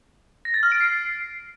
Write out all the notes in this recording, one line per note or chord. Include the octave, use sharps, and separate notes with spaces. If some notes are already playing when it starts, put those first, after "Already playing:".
A#6
A6
F6
D7
C7